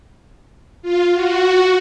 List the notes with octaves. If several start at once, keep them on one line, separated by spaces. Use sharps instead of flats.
F4
F#4